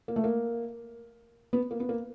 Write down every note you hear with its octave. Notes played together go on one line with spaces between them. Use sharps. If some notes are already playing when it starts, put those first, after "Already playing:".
A#3
A3
A#3
B3
A#3
B3
A#3